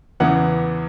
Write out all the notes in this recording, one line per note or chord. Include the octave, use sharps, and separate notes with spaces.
E2 C#3 E3 B3 F#5